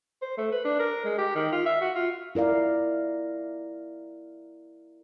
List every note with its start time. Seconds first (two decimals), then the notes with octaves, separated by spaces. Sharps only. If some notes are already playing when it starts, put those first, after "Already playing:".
0.22 C5
0.38 A3
0.52 B4
0.65 D4
0.79 A#4
1.05 G#3
1.18 G4
1.35 D#3
1.52 F4
1.66 E5
1.81 F#4
1.95 F4
2.35 E4 A#4 D5 F5